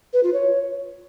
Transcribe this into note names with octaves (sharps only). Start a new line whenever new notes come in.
B4
F4
C#5